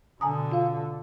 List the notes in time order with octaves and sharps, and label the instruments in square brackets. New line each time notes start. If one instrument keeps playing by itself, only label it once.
[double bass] B2 D3 [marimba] G#5 A#5 D#6
[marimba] F4 F5